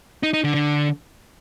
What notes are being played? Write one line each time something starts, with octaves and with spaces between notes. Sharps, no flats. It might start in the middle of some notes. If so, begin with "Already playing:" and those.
D#4
D#4
D3
D3